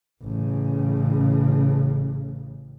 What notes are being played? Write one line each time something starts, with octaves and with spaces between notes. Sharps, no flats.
A1 C#3